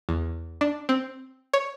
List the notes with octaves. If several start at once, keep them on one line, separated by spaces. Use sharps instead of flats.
E2
D4
C4
C#5